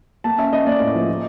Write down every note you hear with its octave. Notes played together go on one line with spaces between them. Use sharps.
A#3 A5
C#4 E5
C#4 D#5
A#3 D5
A2
F3
F3